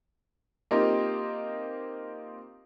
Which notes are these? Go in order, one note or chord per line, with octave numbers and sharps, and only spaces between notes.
A#3 C4 D#4 F4 G4